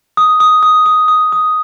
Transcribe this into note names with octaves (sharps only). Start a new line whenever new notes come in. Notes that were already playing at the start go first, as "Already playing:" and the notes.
D#6
D#6
D#6
D#6
D#6
D#6